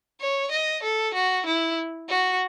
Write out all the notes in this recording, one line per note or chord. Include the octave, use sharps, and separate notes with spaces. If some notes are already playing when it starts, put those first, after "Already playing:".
C#5
D#5
A4
F#4
E4
F#4